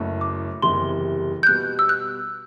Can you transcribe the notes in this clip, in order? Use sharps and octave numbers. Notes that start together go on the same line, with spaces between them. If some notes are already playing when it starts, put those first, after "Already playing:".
Already playing: F#1 F#2 F#3 A3 E4
D6
F#1 E2 C3 E3 G3 C6
G6
B2 G3 B3 F#6
E6
F#6